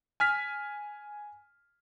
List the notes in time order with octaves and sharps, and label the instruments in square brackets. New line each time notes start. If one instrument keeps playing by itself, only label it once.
[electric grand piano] G#5 F6 B6